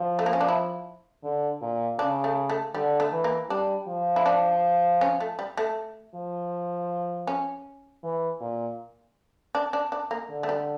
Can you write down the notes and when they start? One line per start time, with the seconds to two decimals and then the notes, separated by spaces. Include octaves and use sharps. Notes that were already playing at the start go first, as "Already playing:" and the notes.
Already playing: F3
0.19 A3
0.26 A#3
0.33 C#4
0.41 D4
0.48 E4
1.24 D3
1.61 A#2
1.99 C#3 D4
2.24 A3
2.50 A3
2.74 D3 G3
3.00 A3
3.12 E3
3.24 A#3
3.50 G3 D4
3.88 F3
4.16 E4
4.26 D4
5.01 C#4
5.20 A3
5.39 G3
5.57 A3
6.15 F3
7.27 C#4
8.03 E3
8.40 A#2
9.55 D4
9.73 D4
9.92 D4
10.11 A#3
10.30 D3
10.43 A3
10.49 G3